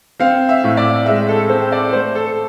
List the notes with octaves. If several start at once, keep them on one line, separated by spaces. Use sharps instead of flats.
C4 F5
E5
A2
D5
G#3 E5
A4
C4 C5
D5
A3 C5
A4